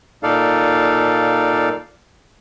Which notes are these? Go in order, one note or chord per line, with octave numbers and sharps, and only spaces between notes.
A#2 D#4 A4 D5 F5